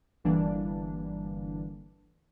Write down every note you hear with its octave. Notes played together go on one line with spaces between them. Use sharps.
G1 D3 E3 G3 A#3 D4